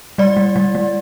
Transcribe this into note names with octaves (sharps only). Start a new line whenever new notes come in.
G3 D5
G3
G3
G3